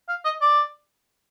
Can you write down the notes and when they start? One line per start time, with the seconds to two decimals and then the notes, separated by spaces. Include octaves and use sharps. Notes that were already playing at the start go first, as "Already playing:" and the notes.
0.09 F5
0.25 D#5
0.41 D5